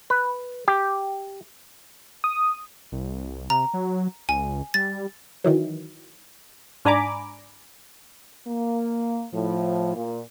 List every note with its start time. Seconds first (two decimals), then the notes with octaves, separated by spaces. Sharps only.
0.10 B4
0.68 G4
2.24 D#6
2.92 C2
3.50 C3 A#5
3.74 F#3
4.29 C#2 G#5
4.74 G3 A6
5.44 D#3 E3 F#3
6.85 G#2 D4 G#5 A#5 B5 D6
8.47 A#3
9.33 A2 F3
9.95 A#2